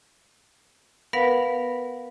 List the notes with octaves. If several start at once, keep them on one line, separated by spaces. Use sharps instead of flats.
B3 A#4 B4 F5 F#5